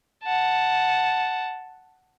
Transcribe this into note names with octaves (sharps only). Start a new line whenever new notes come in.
F#5 A5